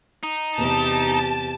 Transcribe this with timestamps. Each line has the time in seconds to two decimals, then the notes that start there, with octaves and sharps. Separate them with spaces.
0.23 D#4
0.57 E2 C3 G4 A5